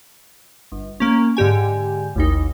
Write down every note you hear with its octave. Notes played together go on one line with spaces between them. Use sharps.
G1
A#3 C#4
G#2 D3 G4 G#5
A1 D#2 D#4